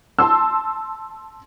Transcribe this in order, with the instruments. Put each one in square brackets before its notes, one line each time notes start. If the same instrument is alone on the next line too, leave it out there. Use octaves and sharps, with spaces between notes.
[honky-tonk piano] A5 C6 E6